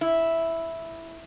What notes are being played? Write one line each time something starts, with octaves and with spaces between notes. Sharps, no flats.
E4